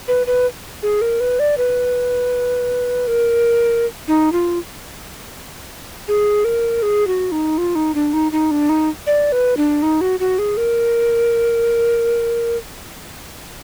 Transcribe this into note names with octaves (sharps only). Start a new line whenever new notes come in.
B4
B4
G#4
A#4
B4
D5
B4
A#4
D#4
F4
G#4
A#4
G#4
F#4
D#4
F4
D#4
D4
D#4
D#4
D4
D#4
D5
B4
D4
D#4
F#4
F#4
G#4
A#4